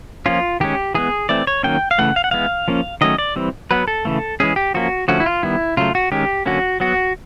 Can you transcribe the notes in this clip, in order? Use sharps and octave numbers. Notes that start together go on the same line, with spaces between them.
F3 A#3 C#4 F4
D#3 G#3 C#4 G4
E3 G#3 B3 G#4
E3 A3 C4 D5
C#5
D#3 F#3 A#3 C#4 G5
F5
C#3 E3 A3 F#5
F5
F#5
E3 G#3 B3 F5
F3 A#3 C#4
D#3 F#3 A3 C#4 D#5
D5
E3 G3 C4
F#3 B3 B4
A4
C#3 E3 A3
E3 G#3 C#4 G#4
G4
F3 A#3 C#4 F#4
D3 F3 A3 C#4 F#4
E4
F4
D#3 G3 B3 E4
C#3 F#3 A3 F4
F#4
D#3 G#3 C#4 G4
D3 F#3 A#3 C#4 F#4
F#3 B3 F#4